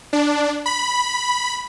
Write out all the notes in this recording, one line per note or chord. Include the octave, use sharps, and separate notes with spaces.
D4
B5